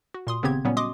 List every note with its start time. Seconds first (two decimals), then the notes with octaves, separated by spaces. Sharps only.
0.14 F#4
0.27 A#2 C6 D#6
0.43 G#1 C#3 B3 C4 G4 G#6
0.65 A#2 F#3 G3 B3 C#4
0.77 F#4 D#5 C6 D6 D#6